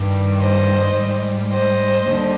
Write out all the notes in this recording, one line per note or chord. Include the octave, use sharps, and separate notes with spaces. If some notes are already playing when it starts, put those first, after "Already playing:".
Already playing: G2 D#3 G3
C5 D#5
G#2 G3
C5 D#5
D#2 D3 G3